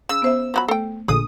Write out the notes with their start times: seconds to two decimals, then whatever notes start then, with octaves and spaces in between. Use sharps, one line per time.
0.09 C#3 E6
0.22 B3 C5 E5
0.54 F3 F#3 B5
0.68 A3 A4 G5
1.08 A#1 D3 G#4 D#6